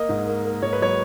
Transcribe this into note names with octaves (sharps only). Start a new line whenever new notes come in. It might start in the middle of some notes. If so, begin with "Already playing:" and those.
Already playing: A#3 D#5
G#2
A#3
A#3
G#2 C#5
B4
F#3 C#5